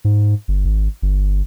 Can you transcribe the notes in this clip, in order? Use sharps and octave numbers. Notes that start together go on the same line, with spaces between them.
G#2
G1
G#1
G1